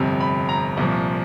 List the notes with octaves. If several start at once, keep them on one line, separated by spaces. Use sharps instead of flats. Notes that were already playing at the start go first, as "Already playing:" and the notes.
Already playing: G1 F2 C3
B5
A#5
C2 A#2 F3